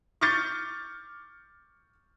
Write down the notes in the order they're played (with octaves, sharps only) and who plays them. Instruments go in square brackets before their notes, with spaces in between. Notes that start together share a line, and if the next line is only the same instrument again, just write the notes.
[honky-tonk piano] C#6 D6 F6 G6 A6 C#7